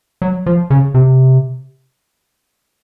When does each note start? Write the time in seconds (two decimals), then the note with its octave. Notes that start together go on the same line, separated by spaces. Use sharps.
0.22 F#3
0.46 F3
0.70 C#3
0.94 C3